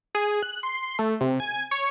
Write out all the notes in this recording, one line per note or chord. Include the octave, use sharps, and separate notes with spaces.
G#4
F#6
C6
A3
C3
G#5
C#5